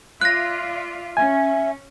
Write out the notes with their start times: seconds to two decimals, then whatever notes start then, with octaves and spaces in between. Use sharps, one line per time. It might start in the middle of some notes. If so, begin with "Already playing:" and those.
0.21 F4 D5 E5 F#6 A#6
1.17 C#4 E5 G#5